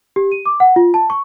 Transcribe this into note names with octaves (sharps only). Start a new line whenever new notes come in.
G4
D#7
D6
F#5
F4
A5
C#6